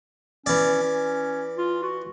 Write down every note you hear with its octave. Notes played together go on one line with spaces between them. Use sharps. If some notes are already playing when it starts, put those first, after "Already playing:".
E3 C#4 D5
C#4
F4
F#4